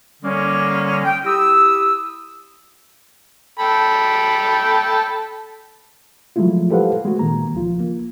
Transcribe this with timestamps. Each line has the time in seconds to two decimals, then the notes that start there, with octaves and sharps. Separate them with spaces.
0.23 D3 G3 G#3 A#3 C#4
1.05 G5
1.25 E4 G4 D#6 E6
3.59 A4 G5 B5
6.36 F3 F#3 G#3 A3 E4 F4
6.71 G4 A4 B4 C5 F5 F#5
7.05 G#3 A3 F#4
7.19 A#2 D#3 A#3 A#5
7.54 C#2 F3 F4
7.80 A#3